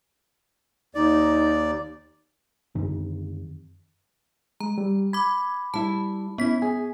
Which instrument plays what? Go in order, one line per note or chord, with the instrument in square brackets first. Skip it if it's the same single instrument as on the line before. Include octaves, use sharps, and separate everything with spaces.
[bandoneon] D#2 D5 [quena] D#4
[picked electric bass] F#2 D3 D#3 C4
[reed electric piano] G#3 [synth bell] A#5
[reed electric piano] G3
[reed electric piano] B5 [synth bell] D6 G#6
[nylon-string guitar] G3 E4 [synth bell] A5
[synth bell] B3 B6 [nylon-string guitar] C#4 E4
[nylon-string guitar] G#4 [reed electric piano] G#5